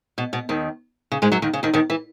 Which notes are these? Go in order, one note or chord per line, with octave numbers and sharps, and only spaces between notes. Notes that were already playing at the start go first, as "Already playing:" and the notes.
B2
B2
D#2 D#3
C#3
G#2 G#3
F#2 F#3
D#2 D#3
C#3
D#2 D#3
D#2 D#3
E3